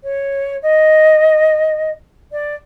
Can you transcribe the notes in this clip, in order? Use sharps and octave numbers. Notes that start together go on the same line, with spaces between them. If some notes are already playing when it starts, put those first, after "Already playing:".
C#5
D#5
D5